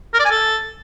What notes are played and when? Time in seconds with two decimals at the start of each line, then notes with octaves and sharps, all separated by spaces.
0.14 A#4
0.20 D5
0.25 G#5
0.31 A4